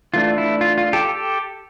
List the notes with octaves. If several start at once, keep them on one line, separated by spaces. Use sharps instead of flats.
E3 A3 D4 F4
E4
F4
F4
G4 A4